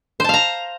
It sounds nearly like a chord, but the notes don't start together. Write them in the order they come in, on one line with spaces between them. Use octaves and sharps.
C5 A5 F5 A#5